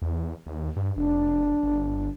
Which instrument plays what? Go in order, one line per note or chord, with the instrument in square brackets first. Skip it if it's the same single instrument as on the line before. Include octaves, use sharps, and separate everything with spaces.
[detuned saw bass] E2
D#2
G2
[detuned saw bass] F1 [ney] D4
[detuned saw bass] G1